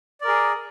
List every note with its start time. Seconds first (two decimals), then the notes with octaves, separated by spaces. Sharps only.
0.21 D5
0.24 A#4
0.28 G#4